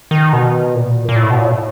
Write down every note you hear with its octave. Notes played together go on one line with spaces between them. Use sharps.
D#3
B2
A#2
A#2
A2
B2
A#2
A2